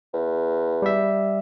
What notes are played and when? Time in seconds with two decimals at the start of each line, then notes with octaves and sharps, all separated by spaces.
0.14 E2
0.82 G3 E5